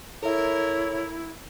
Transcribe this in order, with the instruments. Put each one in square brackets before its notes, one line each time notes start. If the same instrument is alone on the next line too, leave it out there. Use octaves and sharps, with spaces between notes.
[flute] E4 [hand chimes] A4 E5 [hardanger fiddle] A#4 [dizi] C#5